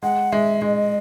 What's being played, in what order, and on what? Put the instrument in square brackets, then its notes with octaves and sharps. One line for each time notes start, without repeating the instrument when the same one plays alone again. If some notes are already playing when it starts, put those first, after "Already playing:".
[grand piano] G#3 [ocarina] F#5
[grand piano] G#3 [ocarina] E5
[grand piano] G#3 [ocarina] D#5